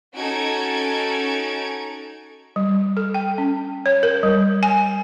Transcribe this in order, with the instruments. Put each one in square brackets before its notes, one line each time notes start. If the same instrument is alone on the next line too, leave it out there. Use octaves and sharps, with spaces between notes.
[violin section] C#4 D#4 F#4 A4 G#6 D7
[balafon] G3
A4
G5
C#4
C#5
A#4
G3
G#5